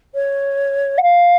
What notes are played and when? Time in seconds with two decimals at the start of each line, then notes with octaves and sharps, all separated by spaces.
0.14 C#5
0.97 F#5
1.02 F5